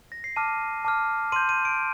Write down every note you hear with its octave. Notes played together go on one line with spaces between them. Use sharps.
A#6
C7
A5 D6 F6 D#7
A5 D6 F6
C6 G6 D#7
D#7
D7